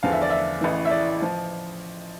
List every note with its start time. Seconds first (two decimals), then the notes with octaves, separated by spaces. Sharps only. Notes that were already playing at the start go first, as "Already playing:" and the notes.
0.03 E2 D3 F3 F5
0.12 E5
0.22 D5
0.30 E5
0.61 A1 A2 E3
0.85 E5
0.90 D5
1.22 F3